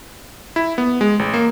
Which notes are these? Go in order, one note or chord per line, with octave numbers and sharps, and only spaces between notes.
E4
B3
G#3
A1
A#3